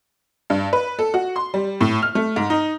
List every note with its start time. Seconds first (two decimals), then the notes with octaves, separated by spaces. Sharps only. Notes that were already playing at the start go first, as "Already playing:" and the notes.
0.50 G2
0.73 B4
0.99 A4
1.14 F#4
1.36 C6
1.54 G3
1.81 A2
2.02 F6
2.15 A3
2.36 G#2
2.50 D#4